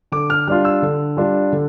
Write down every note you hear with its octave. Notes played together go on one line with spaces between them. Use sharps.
D3 D6
F6
G3 D4 F4 F6
E6
D3
G3 D4 F4
D3